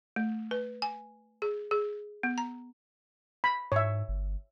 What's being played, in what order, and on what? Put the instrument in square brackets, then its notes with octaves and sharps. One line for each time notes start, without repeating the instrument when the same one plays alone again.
[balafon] A3
B4
G#5
G#4
G#4
B3
A#5
[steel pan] B5
[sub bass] G#2 [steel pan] C#5 E5
[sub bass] G1